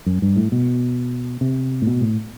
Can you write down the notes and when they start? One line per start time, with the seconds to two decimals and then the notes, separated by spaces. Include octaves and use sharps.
0.06 F#2
0.22 G2
0.36 A2
0.52 B2
1.41 C3
1.82 A2
1.87 B2
2.01 A2